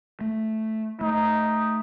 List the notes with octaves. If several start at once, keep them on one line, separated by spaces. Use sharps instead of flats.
A3
A3 D#4